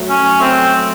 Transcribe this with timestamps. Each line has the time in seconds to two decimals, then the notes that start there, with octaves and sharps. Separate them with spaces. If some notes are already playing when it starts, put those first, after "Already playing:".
Already playing: F#3 A3
0.09 C#4
0.40 A3 C4